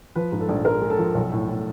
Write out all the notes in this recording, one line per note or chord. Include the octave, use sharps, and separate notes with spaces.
F3 B4
G#2
A4
A#1
G#3 A#4
G#3
A4
F3
B1
A2
A2